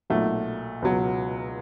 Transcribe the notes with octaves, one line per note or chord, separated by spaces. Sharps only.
B1 A#2 F#3 A3
C#2 B2 F#3